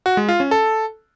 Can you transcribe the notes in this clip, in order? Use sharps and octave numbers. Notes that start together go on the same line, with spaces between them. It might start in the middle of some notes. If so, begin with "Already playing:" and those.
F#4
G#3
F4
C#4
A4